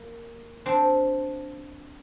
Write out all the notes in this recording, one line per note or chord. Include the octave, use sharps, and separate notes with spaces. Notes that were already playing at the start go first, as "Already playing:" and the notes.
Already playing: A#3
C4 D4